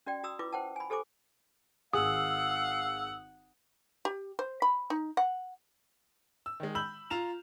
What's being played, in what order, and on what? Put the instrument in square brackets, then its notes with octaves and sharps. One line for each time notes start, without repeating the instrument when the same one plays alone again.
[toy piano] C#4 F#4 D5 G5
F#4 A#5 D#6 E6
E4 F4 B4 D6
C5 F#5 G5 A5
G#5 B5
G4 A4 C5 G#5 D6
[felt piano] G#1 G#4 [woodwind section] F5 E6 [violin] F#5 [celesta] D#6
[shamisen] G4
C5
B5
D#4
F#5
[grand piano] E6
D#3 G#3
B5 E6 G6 F#7
F4 A#5 E7 F7